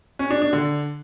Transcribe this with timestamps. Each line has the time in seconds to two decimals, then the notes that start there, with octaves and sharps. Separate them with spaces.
0.19 C#4
0.31 D4
0.42 D4
0.53 D3